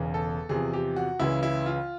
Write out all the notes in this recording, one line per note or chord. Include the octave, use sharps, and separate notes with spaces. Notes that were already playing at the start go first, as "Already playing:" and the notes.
Already playing: E1 E2 C#3
A4
E2 C3 F3 G#4
G4
F#4
C#2 C#3 E3 E4
E4
F4